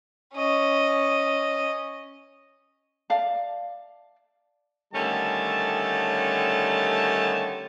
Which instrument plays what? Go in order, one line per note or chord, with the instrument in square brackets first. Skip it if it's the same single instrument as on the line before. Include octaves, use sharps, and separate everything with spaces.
[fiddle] C#4 D#5
[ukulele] D5 E5 F5 A5
[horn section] D3 D#3 G3 A3 C#4 A5